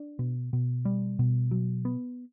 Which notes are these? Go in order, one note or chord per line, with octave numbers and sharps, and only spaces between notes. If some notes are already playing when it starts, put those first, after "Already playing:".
Already playing: D4
B2
B2
G3
B2
F#3
B3